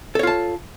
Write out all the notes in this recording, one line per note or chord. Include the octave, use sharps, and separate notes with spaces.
F4 A4 C#5 A5